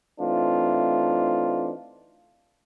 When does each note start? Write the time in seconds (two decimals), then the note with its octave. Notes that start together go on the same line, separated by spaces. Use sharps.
0.20 E3 A3 C4 D4 D#4 F4